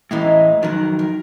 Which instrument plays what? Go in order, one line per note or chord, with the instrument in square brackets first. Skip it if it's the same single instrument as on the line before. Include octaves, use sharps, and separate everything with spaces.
[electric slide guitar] A2 E3 [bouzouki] F#3 G#3 D#4
[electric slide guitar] F2 D#3 F#3 [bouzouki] A#4 F#5
[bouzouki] A#4